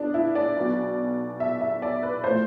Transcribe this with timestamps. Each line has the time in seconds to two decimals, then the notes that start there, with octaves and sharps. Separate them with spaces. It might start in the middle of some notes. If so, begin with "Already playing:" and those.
Already playing: B3 D4
0.14 E4
0.35 D5
0.56 B1 B2
1.40 E5
1.61 E5
1.82 D5
2.03 B4
2.24 A2 F3 C5